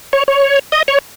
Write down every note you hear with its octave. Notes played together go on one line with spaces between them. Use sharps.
C#5
C#5
D#5
C#5